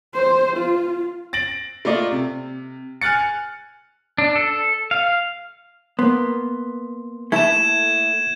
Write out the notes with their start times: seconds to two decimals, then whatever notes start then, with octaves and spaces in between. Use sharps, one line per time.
0.14 C5
0.56 F4
1.33 A6 A#6 D7 F#7
1.85 A3 A#3 F4 D5 D#5
2.12 C3
3.01 G#5 F6 F#6 A6 C#7
4.18 D4
4.36 A4
4.91 F5
5.99 A#3 B3 C6
7.32 A3 E4 A4 G#6 E7